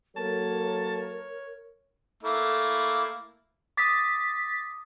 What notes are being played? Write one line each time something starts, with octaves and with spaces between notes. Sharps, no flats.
F#3 A#3 A4 A#4 C#5 A5
A3 A#3 E4
D6 D#6 A6 B6